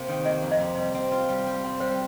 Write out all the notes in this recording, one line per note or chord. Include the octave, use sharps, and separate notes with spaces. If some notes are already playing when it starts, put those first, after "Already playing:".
Already playing: C3 A#3
D#3
A#3 D#5
F2
D#5
C3
G3
C4
F4
G3
G3
C4
G3 C5